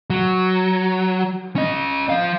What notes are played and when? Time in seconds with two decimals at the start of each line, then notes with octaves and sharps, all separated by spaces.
0.10 F#3
1.56 C#4 D#5
2.09 F3 F5